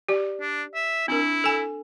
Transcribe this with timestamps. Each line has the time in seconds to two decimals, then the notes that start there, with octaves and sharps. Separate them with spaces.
0.09 G4 D5
0.41 D4
0.75 E5
1.08 C4 D4 E4 A#4
1.44 A4 G#5